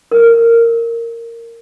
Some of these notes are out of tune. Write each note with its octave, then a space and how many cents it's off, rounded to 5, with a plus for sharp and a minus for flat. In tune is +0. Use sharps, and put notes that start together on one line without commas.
A#4 -10